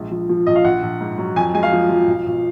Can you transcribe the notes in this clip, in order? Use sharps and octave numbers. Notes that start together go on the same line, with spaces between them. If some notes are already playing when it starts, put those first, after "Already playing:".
Already playing: A#1 G#3
F3
F3
A#1 D#5
F5
A#1 F#5
A#1
G#2
F#3
F2 G#5
G#3 G#5
F5
F3
F3
B1
B1